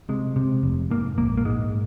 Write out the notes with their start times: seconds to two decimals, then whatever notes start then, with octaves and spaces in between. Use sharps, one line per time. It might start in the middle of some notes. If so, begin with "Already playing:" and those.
0.09 C3 G#3
0.36 C3
0.63 F1
0.91 G#2 A#3
1.18 A#1 A#3
1.37 A#3
1.45 G#2 G#3